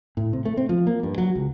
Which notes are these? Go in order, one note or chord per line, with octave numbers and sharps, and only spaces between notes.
A2
C3
A3
C4
F3
A#3
G2
F#3
C#2